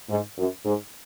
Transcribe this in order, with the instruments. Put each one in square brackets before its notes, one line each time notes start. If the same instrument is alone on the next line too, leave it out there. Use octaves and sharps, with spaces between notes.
[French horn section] G#2
F#2
G#2